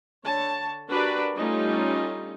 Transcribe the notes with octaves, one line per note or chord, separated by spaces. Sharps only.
D3 C#5 A5
D4 F#4 G4 A#4 B4 D5
G3 A3 C#4 D#4 F4